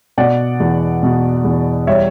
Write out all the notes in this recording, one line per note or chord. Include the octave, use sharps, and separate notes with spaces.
B2 D5 F#5
E2
B2
E2
G3 C#5 E5